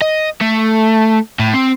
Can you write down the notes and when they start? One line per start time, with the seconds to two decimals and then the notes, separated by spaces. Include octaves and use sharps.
0.02 D#5
0.41 A3
1.39 A2
1.54 C4